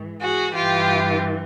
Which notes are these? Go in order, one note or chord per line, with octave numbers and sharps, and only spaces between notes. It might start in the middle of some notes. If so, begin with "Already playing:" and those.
Already playing: G#2 E3
F#4 G#4
G2 E3 F4 G4